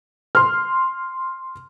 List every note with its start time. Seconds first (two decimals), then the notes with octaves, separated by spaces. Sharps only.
0.35 C6 F6